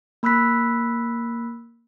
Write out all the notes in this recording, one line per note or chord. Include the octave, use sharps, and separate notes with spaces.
A#3 B5 E6 F#6 B6